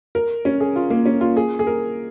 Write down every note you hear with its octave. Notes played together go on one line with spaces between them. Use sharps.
A#4
C#4
G#4
F4
A#3
C#4
F4
G#4
G#4
A#4